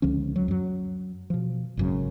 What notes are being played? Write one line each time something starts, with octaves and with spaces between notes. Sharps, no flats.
C#2 D3 F3 C#4
F#3
F#2 F#3
B2 F3
G#1 F#2 C#3